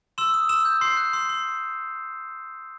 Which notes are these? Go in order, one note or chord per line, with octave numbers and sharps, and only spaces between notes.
C6 E6 E7
D#6
C6 E6 E7
G6
C6 C7
F#6
C6
C6